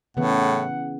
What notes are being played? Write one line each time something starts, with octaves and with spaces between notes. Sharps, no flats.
A2 C#3 E3 B3 F#5